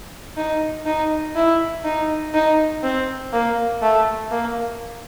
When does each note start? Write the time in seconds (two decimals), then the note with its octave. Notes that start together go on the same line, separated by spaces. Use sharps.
0.37 D#4
0.86 D#4
1.35 E4
1.84 D#4
2.34 D#4
2.83 C4
3.32 A#3
3.82 A3
4.31 A#3